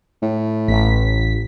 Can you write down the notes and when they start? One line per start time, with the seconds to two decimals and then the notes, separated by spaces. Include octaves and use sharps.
0.22 A2
0.68 A1 B6